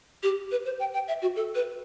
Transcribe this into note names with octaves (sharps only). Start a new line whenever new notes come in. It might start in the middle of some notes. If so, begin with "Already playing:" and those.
G4
B4
C5
G5
G5
E5
F#4
A4
B4